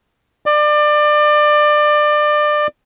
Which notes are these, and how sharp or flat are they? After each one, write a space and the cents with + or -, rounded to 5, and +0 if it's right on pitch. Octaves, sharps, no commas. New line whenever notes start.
D5 +25